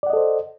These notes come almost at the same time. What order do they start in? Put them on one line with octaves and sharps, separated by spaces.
D5 F#5 D#5 A4 C5